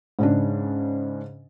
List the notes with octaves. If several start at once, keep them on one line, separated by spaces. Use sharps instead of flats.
G#2 C#3 D4